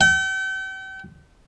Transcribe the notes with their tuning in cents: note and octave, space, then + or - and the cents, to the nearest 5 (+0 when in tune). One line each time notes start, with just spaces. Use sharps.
G5 -40